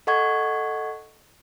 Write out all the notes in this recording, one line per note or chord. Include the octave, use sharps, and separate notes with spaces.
A4 D#5 F#5 C#6 G#6